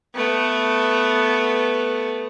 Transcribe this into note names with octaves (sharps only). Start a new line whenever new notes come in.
A3 B3